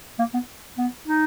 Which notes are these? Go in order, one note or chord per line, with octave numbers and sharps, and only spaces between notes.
A#3
B3
B3
D#4